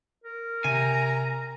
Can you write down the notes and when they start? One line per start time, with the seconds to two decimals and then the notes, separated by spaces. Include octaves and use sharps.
0.24 A#4
0.64 C3 G#5 A#5